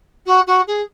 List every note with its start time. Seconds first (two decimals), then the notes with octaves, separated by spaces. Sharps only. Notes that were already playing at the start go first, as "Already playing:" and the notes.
0.26 F#4
0.46 F#4
0.67 G#4